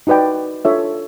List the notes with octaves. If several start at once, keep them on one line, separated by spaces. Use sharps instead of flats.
D#4 F#4 B4 D5 G5
D4 F4 A4 C#5 E5